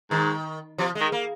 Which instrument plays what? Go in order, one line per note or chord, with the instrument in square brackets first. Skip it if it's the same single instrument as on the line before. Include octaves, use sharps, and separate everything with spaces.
[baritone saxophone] G#2 [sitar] D#3
[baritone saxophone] C3 [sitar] F3
[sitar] G#3
[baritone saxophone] D#3
[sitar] A#3